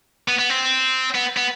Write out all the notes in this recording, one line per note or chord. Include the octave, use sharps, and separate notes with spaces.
B3
B3
C4
B3
B3